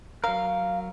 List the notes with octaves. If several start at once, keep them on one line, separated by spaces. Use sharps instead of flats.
F#3 A#4 F5